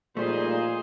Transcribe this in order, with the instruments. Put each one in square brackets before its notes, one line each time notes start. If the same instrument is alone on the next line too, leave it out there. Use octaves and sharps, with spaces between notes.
[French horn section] A#2 [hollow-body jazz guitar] F3 G3 A3 [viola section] D#4 G#4 C5